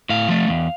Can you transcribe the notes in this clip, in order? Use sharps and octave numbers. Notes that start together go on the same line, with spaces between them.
A2 F5
F3 A3
E2